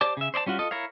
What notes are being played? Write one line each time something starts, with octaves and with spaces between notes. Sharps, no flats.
G4 C5 D5 A5 D6
C#3 E5
C5 D5 D#5 A5
G3 C#4 F4 F#4
F4 A4 D#5
E4 A#4 C#5 F5